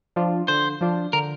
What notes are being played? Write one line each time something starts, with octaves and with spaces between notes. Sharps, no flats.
F3 D4 F4
D3 C5
F3 D4 F4
D3 A#4